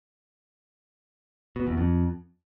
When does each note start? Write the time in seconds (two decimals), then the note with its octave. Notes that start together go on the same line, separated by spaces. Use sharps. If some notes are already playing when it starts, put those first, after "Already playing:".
1.56 B2
1.67 E2
1.77 F2